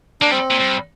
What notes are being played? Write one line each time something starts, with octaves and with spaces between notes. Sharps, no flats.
A#3 D4
G3 C4
A#2
G2